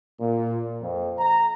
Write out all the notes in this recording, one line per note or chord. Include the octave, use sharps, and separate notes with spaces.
A#2
F2
A#5